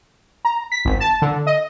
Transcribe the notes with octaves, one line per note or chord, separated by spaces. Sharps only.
A#5
B6
G#1
A5
D3
D#5